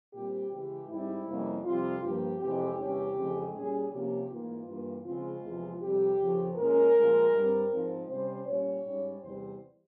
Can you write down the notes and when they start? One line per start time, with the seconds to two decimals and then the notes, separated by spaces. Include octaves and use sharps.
0.13 A#2 G3 C4 G4
0.51 C#3 E3 G#3 G4
0.88 G#2 G3 C4 E4
1.27 F2 C3 G3 A#3 C#4
1.64 F2 C3 G3 C4 F4
2.02 G2 F3 A#3 G4
2.40 F2 C3 E3 G#3 C4 G4
2.78 E2 C3 G3 C#4 G4
3.16 F2 C#3 E3 G#3 C4
3.53 A#2 G3 C#4 G#4
3.91 C3 F3 A#3 C#4 G4
4.30 G#2 E3 A#3 F4
4.67 G2 E3 A#3
5.05 C#3 F3 G#3 C4 F4
5.43 E2 C3 F3 G#3
5.81 F2 C3 G3 G4
6.19 F2 C#3 F3
6.56 A#2 G#3 C#4 A#4
6.95 A#2 F3 G#3
7.32 G2 G3 C4
7.70 G#2 F3 C4
8.08 C3 G3 C#4 C5
8.46 A#2 G3 C#4 C#5
8.84 G#2 G3 C#4
9.22 E2 C3 G3 C5